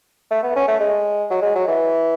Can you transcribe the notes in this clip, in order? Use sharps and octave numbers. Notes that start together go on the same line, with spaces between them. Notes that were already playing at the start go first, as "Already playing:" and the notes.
A3
B3
C#4
A3
G#3
F#3
G#3
F#3
E3